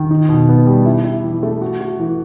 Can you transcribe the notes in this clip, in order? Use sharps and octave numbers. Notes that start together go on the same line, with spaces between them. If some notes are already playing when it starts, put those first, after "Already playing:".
Already playing: D#3
D#4
B2
B3
G3
E4
E4
E3
A3
F#4
F#4
E3